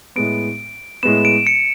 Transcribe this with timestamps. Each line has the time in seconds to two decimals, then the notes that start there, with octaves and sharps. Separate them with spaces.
0.16 A2 G#3 B3 D7
1.03 A2 G#3 B3 E7
1.25 D7
1.47 C#7